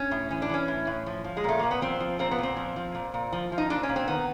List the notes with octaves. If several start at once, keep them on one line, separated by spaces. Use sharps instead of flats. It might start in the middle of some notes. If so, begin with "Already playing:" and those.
Already playing: C#4
A2
E3 C#4
D4
E3 C#4
A2
A2
F3
F3
G#3
A#2 A3
A#2 A#3
B3
F3 C4
F3
A#2 C4
B3
A#2 C4
F3
F3
A#2
A#2
F3
F3
D#4
A#2 D4
C#4
A#2
C4
D#3 B3